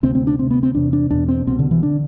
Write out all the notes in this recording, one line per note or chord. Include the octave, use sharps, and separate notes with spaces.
D2 C3 C4
C4
D4
D2 C3 C4
B3
C4
E2 C3 D4
D4
E2 B2 D4
C4
C2 B2 C4
D3
E3
D3 D4